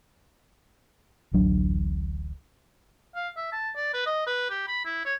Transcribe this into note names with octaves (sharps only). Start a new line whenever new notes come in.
D1 A1 F#3 D4
F5
E5
A5
D5
B4
D#5
B4
G4
B5
E4
C#5